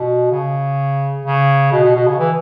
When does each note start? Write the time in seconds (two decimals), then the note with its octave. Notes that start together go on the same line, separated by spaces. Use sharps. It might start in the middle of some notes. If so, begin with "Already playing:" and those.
Already playing: B2
0.32 C#3
1.26 C#3
1.72 B2
1.84 B2
1.95 B2
2.08 C#3
2.18 E3